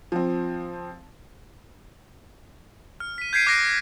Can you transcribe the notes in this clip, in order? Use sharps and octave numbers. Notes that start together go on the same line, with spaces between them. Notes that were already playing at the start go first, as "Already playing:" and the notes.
F3 C4
F6
B6 D#7
G6 G#6 B6 C7 D7 D#7
D6 F#6 G6 A#6 C7 D7